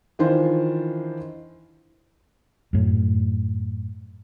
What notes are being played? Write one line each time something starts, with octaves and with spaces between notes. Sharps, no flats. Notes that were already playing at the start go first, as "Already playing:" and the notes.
D#3 E3 D4 F4 C5
F#2 A2